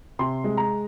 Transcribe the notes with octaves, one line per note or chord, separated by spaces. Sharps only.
C3 C6
G#3
A#5